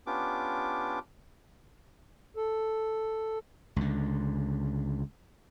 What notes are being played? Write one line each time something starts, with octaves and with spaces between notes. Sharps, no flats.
B3 C#4 D4 F4 G4 D6
A4
C#2 D3